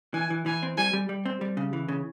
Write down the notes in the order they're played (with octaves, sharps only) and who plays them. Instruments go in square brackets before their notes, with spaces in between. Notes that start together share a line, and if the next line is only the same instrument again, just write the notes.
[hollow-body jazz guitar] E3 [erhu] G#5
[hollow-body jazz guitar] E3
[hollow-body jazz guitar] E3 [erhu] G#5
[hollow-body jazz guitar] C4
[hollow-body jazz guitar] G3 [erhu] G#5
[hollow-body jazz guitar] G3
G3
C4
G3
C#3
E3
C#3